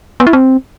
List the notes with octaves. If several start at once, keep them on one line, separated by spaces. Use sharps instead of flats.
B3
E4
C4